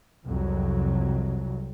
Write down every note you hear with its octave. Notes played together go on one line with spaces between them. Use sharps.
C2 F2 F#3